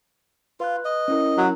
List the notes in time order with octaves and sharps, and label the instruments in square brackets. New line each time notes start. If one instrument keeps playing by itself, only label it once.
[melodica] F4 [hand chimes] B4 F#6
[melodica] D#5
[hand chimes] C#4 E4 A#4
[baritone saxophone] F#3